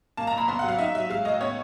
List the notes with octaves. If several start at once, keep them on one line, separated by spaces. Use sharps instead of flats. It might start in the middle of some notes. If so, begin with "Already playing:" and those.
A#3 A5
A#5
A#2
B5
B3 C6
F#5
F#3 F5
D#4 E5
F#3 E5
G#3 F5
A2 D#5
B3 C#5